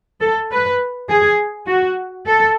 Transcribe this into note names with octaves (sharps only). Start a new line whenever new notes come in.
A4
B4
G#4
F#4
A4